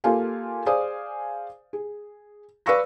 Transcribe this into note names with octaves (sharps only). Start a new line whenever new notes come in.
A#3 F4 G4 A4 F5 G#5
G#4 C5 D5 F5 G#5 D#6
G#4
B4 D5 F5 C#6 E6 A#6